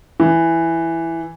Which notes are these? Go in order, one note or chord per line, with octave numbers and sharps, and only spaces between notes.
E3